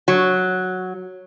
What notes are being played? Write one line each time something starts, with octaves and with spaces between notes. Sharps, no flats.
F#3